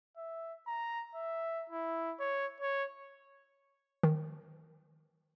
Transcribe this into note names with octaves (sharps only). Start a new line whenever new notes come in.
E5
A#5
E5
E4
C#5
C#5
D#3